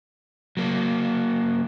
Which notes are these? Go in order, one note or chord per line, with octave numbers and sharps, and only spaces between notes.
F#3 A#3